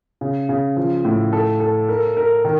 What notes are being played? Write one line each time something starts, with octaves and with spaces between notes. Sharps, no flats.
C#3
C#3
F3
A2
A4
A4
A#4
A#4
D#3